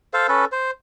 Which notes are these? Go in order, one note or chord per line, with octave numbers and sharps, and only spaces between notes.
A4 C5 F5
C#4 A4 B4
C5